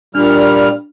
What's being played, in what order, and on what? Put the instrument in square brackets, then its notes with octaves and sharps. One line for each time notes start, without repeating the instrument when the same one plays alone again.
[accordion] A#2 G3 F6 [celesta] D4